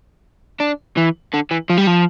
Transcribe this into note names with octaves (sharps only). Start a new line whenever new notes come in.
D4
E3
D3
E3
F3
G3
F3